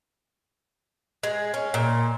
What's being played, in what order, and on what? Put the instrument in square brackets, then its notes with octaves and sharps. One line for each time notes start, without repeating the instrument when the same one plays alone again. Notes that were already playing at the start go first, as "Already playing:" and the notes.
[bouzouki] G#3
C#4
A#2